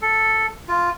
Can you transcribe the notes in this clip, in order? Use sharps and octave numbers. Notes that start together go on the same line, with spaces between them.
A4
F4